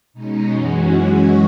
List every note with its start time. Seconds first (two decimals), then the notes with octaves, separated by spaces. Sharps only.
0.13 B2 G#3 C#4 D#4
0.50 F#2 E3 G#3 C#4 F#4